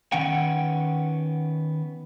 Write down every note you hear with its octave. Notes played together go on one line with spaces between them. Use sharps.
D#3 B3 C#4 F#5 G5